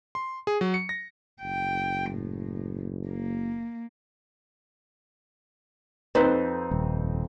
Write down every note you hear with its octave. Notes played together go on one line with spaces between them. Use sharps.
C6
G#4
F#3
C#7
A#6
F#1 G5
A2
A#3
F2 C4 D#4 B4 C5
D#1